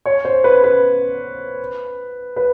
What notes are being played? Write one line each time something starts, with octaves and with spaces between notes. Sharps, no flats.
C#5
C5
B4
B4
B4